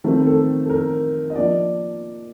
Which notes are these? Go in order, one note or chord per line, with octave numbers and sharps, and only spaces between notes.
D#3 A3 C4 A#4
A4
A4
A#4
D#5
F3 A#3 D4 D5